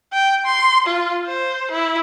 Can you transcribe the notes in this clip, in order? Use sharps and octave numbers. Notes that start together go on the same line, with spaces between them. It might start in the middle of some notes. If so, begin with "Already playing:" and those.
G5
C6
F4
C5
E4